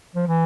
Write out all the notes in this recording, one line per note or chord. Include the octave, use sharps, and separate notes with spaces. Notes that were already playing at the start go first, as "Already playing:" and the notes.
F3
E3